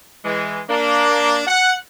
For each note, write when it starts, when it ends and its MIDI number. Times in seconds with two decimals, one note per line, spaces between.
0.25 0.60 52
0.25 0.60 56
0.69 1.41 58
0.69 1.41 62
1.47 1.72 78